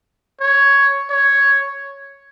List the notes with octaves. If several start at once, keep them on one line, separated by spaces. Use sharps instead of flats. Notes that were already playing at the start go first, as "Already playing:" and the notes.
C#5
C#5